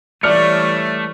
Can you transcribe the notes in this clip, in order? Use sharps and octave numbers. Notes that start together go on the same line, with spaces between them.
E3 G3 A3 C#5 D5 F6 C#7